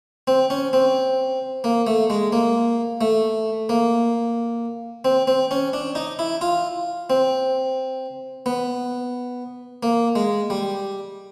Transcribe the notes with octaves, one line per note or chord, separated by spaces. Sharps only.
C4
C#4
C4
A#3
A3
G#3
A#3
A3
A#3
C4
C4
C#4
D4
D#4
E4
F4
C4
B3
A#3
G#3
G3